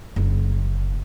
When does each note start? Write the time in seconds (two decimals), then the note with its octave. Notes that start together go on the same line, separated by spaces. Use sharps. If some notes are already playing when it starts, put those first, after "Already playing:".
0.16 F#1 D#4